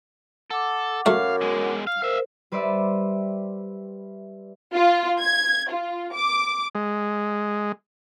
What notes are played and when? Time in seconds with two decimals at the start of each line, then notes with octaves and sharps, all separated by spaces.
0.51 A4 F#5 D6
1.06 F#2 F#3 A3 F5
1.41 B2 G#3
1.87 F5
2.02 A#4 C5 E5 F5
2.52 G3 B4 C5 D5 E5
4.73 F4
5.19 G#6
5.69 F4
6.13 D6
6.75 G#3